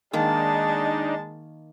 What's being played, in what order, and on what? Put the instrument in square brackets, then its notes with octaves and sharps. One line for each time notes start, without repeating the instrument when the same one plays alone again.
[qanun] D#3 A#3 [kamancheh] G#3 A5 [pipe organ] D4 D#4